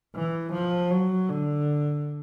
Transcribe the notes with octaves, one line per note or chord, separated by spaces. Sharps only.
E3
F3
F#3
D3